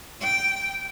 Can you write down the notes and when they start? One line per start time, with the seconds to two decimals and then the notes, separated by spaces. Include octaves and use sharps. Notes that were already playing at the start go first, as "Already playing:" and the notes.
0.21 G5